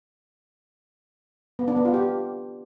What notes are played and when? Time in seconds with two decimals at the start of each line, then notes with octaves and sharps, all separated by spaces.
1.59 B3
1.68 D4
1.76 B3
1.85 F4
1.94 G4